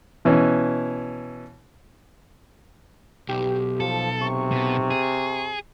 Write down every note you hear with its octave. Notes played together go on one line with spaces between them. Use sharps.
B2 E3 C#4
B1 G4
F3 A4
C3 C#6
B2
G#4